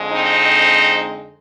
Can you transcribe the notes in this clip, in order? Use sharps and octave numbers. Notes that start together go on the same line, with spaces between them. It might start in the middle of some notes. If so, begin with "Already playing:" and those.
Already playing: F2 D3 G#3
C4 D#4